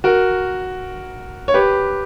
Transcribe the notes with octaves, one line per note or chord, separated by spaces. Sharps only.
F#4 A#4
C#5
G4 B4